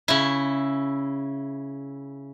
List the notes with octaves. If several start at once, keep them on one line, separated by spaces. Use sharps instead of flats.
C#3 E4